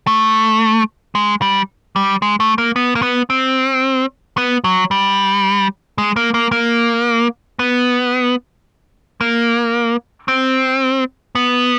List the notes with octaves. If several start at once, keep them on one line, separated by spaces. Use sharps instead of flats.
A3
G#3
G3
G3
G#3
A3
A#3
B3
A#3
B3
C4
B3
F#3
G3
G#3
A#3
A#3
A#3
B3
A#3
C4
B3